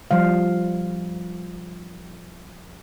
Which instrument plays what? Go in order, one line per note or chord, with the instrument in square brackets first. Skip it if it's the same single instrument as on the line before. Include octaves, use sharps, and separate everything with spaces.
[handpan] F3 G3 F5